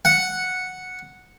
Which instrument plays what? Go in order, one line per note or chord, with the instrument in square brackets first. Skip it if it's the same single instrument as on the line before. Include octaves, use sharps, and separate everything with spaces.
[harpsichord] F#5